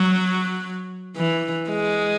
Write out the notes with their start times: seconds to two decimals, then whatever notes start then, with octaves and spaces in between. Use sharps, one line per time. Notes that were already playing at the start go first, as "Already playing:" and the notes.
Already playing: F#3
1.17 E3
1.70 G#3